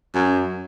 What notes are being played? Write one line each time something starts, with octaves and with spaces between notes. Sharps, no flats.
F#2